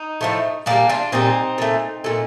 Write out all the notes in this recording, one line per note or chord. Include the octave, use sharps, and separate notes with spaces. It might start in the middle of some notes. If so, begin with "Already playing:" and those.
Already playing: D#4
A2 F3 A3
A#2 G3 A#3 D4
D4 F4
A#2 G3 C4 D#4
A#2 A3
A#2 A3